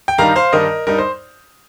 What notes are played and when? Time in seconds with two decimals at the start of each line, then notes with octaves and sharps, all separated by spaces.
0.08 G5
0.18 G2 D#3 G3 D#4 F5 A#5
0.36 C5 F5
0.53 G2 D#3 G3 D#4 A#4 D#5
0.86 G2 G3 D#4 A#4
0.98 C5